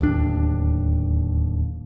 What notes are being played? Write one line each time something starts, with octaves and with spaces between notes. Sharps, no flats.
D1 D#2 D4